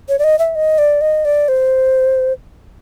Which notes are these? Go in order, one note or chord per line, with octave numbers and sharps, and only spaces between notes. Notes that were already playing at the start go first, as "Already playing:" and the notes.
C#5
D5
D#5
E5
D#5
D5
D#5
D5
C5